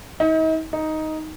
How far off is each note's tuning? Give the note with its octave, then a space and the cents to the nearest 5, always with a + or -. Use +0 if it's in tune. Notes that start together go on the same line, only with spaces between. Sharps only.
D#4 +40
D#4 +5